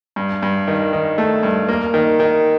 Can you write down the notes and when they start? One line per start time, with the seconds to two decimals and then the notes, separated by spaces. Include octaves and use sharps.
0.16 G2
0.43 G2
0.68 D#3
0.93 D#3
1.18 A3
1.43 G2
1.69 A#3
1.94 D#3
2.20 D#3